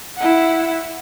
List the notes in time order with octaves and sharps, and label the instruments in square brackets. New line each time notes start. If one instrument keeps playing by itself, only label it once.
[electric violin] E4 F#5